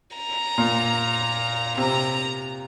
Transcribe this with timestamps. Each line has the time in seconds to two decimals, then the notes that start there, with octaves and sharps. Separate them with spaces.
0.17 A#5
0.58 A#2
1.78 C3 A#5